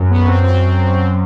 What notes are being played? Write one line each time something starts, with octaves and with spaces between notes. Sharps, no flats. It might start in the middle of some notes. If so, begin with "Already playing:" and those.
Already playing: F#2 F#3
B3
C4
C4